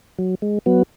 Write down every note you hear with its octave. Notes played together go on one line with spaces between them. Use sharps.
F#3
G#3
F#3 B3